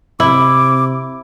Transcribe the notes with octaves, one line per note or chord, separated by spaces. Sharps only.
C3 E4 D6